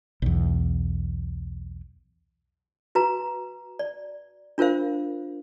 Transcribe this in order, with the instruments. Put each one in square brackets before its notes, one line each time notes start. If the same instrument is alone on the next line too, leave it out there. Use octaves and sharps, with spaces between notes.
[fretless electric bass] B1 E2
[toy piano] F#4 B4 A#5
D5
D4 F4 A#4 C5 F5